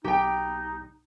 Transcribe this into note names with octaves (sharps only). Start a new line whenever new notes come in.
B1 D#4 G4 G5